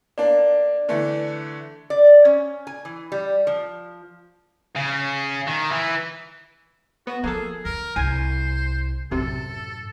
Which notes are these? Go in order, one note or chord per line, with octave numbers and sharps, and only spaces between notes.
A#3 D4 D5
D3 E3 A3
D5
C#4
G#5
E3
G3
F3
C#3
D#3
E3
B3 F#4
F3 A#3 G#4 A4
D#2 A#4
C2 C5 G#5
B1 F#2 A2 C3 A4